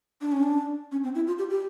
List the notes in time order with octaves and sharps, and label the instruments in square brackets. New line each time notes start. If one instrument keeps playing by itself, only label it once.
[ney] D4
C#4
D4
C#4
C4
E4
F4
G4
G4